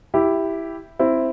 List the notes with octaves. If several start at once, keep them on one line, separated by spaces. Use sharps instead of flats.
E4 G4
C4 E4